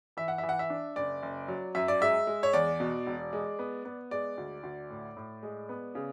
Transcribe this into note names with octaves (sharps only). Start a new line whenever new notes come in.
E3 E5
F#5
E5
E3
F#5
E5
D4
F#1 D5
F#1
F#3
F#2 E5
D5
G#3 E5
G#3
C#5
E2 D5
B2
E1
G#3
B3
B3
G#3 D5
D2
D2
A2
A2
G#3
B3
C#3